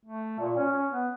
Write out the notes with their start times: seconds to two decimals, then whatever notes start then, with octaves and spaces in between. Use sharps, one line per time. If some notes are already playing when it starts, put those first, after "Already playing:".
0.05 A3
0.39 A#2
0.57 C#4
0.72 C#4
0.91 B3